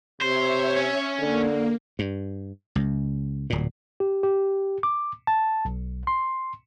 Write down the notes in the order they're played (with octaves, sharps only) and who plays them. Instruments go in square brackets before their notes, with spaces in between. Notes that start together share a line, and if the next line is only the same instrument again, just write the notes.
[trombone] C3 [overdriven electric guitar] C5 [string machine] C#5 E5
[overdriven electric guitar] C#4
[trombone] D3 [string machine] A#3
[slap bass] G2
C#2
D1 A#2
[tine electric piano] G4
G4
D6
A5
B1
C6